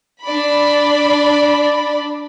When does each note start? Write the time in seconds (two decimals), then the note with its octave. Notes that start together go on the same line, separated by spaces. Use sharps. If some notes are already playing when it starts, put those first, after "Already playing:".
0.24 D4 D5 B5